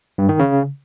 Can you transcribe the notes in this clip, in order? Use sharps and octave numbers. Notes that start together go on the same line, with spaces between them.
G2
D#3
C#3